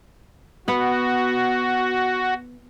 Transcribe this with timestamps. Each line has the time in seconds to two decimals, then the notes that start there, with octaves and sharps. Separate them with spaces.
0.68 B3 F#4 F#5